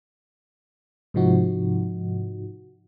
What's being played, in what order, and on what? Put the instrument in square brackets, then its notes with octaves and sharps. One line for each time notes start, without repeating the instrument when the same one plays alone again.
[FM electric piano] G#2 C3 F3 D#4 F#4